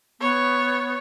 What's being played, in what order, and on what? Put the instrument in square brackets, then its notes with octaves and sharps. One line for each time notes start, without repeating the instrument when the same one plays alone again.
[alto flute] B3 [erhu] C#5